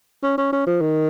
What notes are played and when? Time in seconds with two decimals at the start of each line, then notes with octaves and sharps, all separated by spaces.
0.23 C#4
0.38 C#4
0.52 C#4
0.66 F3
0.81 D#3